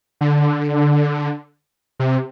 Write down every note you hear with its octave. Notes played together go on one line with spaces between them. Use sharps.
D3
C3